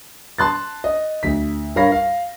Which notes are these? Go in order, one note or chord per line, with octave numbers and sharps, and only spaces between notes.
A5 C6 F#6 A6
D#5
D2 B6
G2 A#4 C#5 F5 B5 A#6
F5